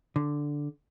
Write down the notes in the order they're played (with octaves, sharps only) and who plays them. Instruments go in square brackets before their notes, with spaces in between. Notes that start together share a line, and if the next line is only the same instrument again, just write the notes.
[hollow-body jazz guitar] D3